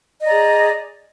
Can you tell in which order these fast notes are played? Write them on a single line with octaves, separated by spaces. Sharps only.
D#5 D5 A#5 G#4